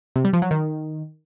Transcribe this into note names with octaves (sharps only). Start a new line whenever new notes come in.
C3
G3
F3
F#3
D#3